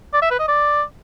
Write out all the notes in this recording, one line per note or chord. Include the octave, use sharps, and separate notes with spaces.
D5
E5
B4
D#5
D5